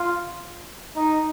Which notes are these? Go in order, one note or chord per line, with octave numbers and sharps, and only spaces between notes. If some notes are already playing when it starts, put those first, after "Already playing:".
Already playing: F4
D#4